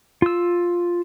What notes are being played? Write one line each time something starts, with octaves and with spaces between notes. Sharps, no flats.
F4 E6